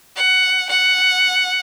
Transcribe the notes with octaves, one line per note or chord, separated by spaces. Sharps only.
F#5
F#5